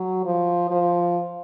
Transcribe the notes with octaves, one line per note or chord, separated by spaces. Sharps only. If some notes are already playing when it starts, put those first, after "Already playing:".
Already playing: F#3
F3
F3